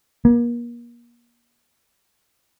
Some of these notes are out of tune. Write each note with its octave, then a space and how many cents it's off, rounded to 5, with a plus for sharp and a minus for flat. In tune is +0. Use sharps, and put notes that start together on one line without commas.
A#3 +35